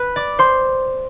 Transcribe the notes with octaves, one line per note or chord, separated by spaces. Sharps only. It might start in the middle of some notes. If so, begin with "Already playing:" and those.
Already playing: B4 B5
D5 D6
C5 C6